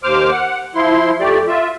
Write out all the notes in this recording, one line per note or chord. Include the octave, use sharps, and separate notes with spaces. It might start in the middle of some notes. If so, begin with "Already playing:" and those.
D#2 C5 D6 F6
F#5
F3 E4 C6
F2 A3 G4 D5
F4 E5